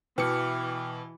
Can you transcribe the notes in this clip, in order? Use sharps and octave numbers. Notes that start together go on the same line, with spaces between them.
B2 E3 G5 D6 F6 C#7